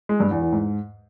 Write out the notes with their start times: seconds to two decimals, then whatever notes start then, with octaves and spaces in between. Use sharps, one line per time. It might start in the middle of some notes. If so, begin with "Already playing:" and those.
0.09 G#3
0.20 G2
0.31 E2
0.42 E2
0.53 G#2